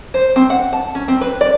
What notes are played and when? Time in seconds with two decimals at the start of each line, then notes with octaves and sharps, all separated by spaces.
0.14 C5
0.36 C4
0.50 F#5
0.73 A5
0.95 C#4
1.08 C4
1.21 B4
1.41 D5